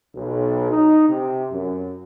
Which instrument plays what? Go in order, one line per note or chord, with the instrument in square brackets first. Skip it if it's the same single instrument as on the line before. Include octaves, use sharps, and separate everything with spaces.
[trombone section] B1
D#4
C3
F#2